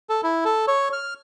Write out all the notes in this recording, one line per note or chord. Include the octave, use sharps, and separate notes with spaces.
A4
E4
A4
C#5
F6